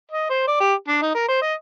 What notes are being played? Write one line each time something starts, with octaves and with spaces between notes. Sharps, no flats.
D#5
C5
D5
G4
D4
D#4
A#4
C5
D#5